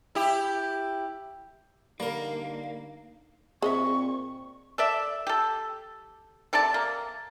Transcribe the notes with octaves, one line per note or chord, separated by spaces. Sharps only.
E4 G4
D3 G3 A#3 D#4 A#4
A#2 C4 G#4 D#5 E5 C#6
A4 D5 E5
G4 A4
C3 A4 D5 A5
A#3